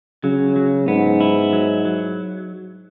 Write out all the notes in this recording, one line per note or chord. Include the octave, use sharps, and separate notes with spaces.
C#3 F#3
F#3
G#2 B3
E4
F#3
F#3